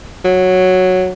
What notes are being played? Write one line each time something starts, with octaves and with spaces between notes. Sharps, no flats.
F#3